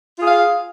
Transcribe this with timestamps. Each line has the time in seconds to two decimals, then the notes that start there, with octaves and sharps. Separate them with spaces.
0.17 F4
0.22 G#4
0.26 F5